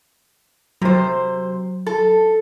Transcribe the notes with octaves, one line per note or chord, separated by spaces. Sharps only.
C3 F#3 C5
A4